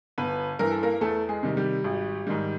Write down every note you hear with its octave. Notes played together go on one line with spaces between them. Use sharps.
G1 B3 B4
G2 E3 A#4
A4
A#3 A#4
E2 A3 A4
G#3 G#4
C3 D#3 G3
G3 G4
G#1
G#2 D#3 G3